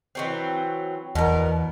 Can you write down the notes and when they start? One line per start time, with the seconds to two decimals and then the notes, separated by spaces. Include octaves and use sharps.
0.15 E3 F#3 C4
1.15 E2 B2 B3 A#4